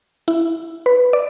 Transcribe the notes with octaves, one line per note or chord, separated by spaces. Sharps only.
E4
B4
D5